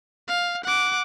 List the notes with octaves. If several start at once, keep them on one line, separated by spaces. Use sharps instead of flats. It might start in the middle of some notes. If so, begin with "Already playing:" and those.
F5
F#5 D6